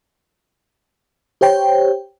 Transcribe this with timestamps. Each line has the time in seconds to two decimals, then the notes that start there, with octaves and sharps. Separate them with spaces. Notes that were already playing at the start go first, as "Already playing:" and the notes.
1.41 G4 C5 C#5 G5